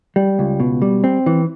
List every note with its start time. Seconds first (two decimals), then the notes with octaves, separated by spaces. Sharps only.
0.16 G3
0.39 C#2
0.60 B2
0.82 G3
1.04 C4
1.26 E3